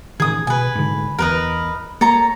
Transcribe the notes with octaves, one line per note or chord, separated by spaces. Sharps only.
A1 D#3 G#4 D#6
B2 B4 G#5
G#2 D3
E2 A#4 B4 D#5
A#3 A4 C#5 A#5